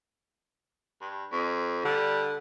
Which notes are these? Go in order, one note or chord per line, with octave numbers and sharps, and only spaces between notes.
G2
F2
D3 G3